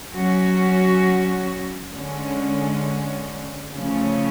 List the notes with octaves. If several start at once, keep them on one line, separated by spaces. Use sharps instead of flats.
F#3 C#4 F#4
D3 G#3 C#4
C#3 F3 A3 C#4